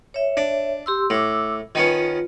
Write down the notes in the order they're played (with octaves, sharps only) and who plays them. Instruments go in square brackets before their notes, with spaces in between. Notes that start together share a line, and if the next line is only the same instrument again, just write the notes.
[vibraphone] C#5 E5
[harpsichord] D4
[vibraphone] G4 C6 E6
[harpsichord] A2 [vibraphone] D6 E6
[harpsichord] D#3 B3 C#4 [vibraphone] F4